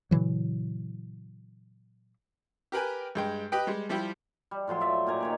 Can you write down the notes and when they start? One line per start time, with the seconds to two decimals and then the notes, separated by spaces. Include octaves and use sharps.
0.11 A#2 C#3 E3 F#3
2.72 G4 A#4 B4 G5 G#5
3.15 G2 G#3 G5
3.52 G4 B4 D#5 G5
3.67 G3 G#3
3.89 F3 G3 E4 G4
4.51 G3
4.68 A2 F3 F#3 C6
4.81 D5 E5
5.06 A#2 G4 G#5 A#5
5.21 D#3 C#5 D5